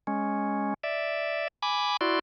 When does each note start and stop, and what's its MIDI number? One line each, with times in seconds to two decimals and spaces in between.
0.07 0.74 56
0.07 0.74 61
0.83 1.48 74
0.83 1.48 76
1.62 1.97 80
1.62 1.97 83
1.62 1.97 86
2.01 2.19 64
2.01 2.19 66
2.01 2.19 74
2.01 2.19 84